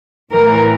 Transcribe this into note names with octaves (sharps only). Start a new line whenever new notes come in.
A2 E3 A#4